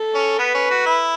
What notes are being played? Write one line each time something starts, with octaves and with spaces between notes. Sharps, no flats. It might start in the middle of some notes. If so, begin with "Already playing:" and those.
Already playing: A4
C#4
B3 B4
C#4
F#4
E4